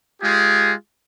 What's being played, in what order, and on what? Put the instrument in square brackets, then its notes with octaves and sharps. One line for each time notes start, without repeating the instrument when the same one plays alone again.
[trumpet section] G#3 F4 G4 G#4